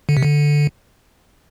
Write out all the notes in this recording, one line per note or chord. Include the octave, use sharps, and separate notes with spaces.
D3
C3
D3